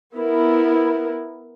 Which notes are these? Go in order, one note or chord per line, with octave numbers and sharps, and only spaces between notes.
B3 E4 A#4